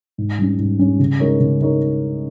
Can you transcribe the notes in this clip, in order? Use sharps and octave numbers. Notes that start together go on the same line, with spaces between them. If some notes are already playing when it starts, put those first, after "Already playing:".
G#2
G3 C#4
G#2
G3 C#4
C#3
G#3 D#4 A#4 C#5
C#3
G#3 D#4 A#4 C#5